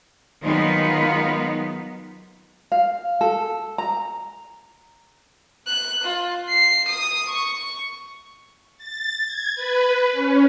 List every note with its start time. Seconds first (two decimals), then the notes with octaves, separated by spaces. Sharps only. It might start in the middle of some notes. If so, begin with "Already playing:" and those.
0.42 D#3 F#3 G#3 B3 D#4 F4
2.72 F5
3.21 A4
3.78 A#5
5.67 F#6
6.04 F4
6.49 C7
6.88 D#6
7.29 C#6
8.77 A6
9.25 G#6
9.55 B4
10.12 C#4